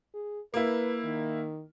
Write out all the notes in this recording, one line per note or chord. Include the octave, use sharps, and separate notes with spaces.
G#4
A#3 E4 B4
D#3